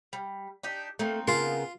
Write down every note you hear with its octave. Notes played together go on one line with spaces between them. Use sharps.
G3
D4 D#4 G4
A3 A#3 C4 D#4
C#3 B3 F4 A#4 C6